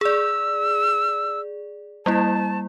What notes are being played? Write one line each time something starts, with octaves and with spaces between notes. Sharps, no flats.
G#4 D5 E6
G3 A#3 E4 A5